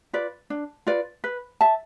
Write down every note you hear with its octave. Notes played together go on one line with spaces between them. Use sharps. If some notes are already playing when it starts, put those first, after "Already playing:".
F4 B4 D5
D4
F4 B4 D5
B4
E5 A5